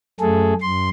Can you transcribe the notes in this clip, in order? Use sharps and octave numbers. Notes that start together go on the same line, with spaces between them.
F#2 A3 G#4 A4
F#2 C6